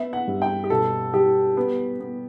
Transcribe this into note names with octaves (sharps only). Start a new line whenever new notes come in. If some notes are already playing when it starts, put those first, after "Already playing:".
Already playing: B3 E5
F#5
G2
G5
G4
B2 A4
G3 G4
B3
B3